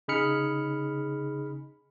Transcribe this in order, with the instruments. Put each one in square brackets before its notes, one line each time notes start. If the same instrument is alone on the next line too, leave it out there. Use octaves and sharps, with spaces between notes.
[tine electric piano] C#3 D#4 G#4 B5 F6 C#7